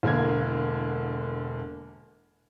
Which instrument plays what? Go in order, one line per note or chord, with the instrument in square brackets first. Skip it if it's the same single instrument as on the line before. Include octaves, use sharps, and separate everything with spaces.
[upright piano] E1 D3 A#3 G#6